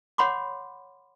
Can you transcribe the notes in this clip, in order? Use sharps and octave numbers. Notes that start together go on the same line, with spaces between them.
C#5 F#5 B5 C6 D6